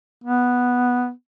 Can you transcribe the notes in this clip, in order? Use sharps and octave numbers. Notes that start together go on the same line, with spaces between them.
B3